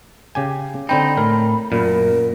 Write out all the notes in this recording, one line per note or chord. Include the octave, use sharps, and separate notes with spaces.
C#3 G4 G#5
D3 C4 D#4 G5 B5
A2 A#4
F#2 A#2 A#4